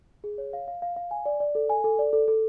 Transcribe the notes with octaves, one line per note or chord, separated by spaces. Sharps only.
G#4
C#5
F5
F5
F5
F5
G#5
D5
D5
A4
G#5
A4
D5
A4
A4